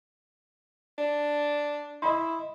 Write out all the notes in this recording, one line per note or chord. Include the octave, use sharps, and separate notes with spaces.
D4
E4 D#5 B5 C6